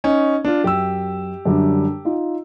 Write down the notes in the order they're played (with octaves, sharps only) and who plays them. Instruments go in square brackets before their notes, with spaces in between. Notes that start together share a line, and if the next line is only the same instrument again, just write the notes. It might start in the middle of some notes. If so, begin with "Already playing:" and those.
[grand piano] C#4 D#4
D4 F4
[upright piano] F#2 [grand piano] G4 E6
[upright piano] F#2 D3 G3
D#4 F4